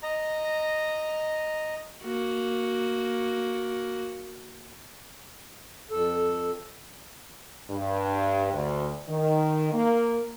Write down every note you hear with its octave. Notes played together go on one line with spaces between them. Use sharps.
D#5 A#5
A#3 F#4
F2 A4
G2
D2
D#3
A#3